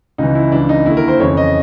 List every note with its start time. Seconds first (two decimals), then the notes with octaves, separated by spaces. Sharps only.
0.18 C#2 C#3 E3 D#4
0.35 E4
0.52 C#2 C#3 E3 D4
0.69 D#4
0.86 D#2 D3 E4
0.97 A#4
1.08 C5
1.20 F2 C#3 E3 C#5
1.37 D#5